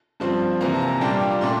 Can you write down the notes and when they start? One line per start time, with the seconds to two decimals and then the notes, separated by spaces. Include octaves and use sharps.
0.20 G2 F3 C4
0.61 C3 E3 A#3 A#5
0.74 A5
0.81 A#5
0.88 A5
1.01 A#2 G3 A#3 D4 G5
1.11 F5
1.21 G5
1.31 A#5
1.41 A#2 A3 D4 C6